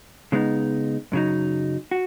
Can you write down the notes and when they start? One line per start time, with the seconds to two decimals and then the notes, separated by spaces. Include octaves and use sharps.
0.32 C#3 G#3 B3 D#4
1.12 F#2 C#3 F#3 D#4
1.91 F#4